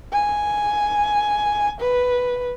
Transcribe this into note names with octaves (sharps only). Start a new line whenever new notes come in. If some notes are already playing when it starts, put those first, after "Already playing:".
G#5
B4